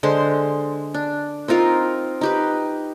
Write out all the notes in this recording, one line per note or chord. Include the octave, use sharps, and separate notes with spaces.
D3 G#3 C5
D4
C4 D#4 F4 A#4
D#4 G4 B4